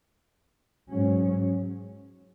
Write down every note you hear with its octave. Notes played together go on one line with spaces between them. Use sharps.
G#2 F#3 C#4